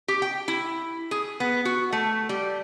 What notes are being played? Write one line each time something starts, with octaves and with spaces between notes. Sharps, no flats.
G4
G5
E4
G#4
B3
F#4
A3
G3